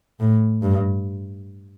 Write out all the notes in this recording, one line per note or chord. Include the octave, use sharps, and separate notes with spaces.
A2
G2